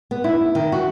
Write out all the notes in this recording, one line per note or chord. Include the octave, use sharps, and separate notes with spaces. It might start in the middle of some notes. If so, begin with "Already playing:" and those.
B3
E4
D#3
F#4